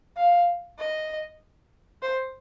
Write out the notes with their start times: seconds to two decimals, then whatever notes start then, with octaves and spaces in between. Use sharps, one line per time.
0.17 F5
0.79 D#5
2.02 C5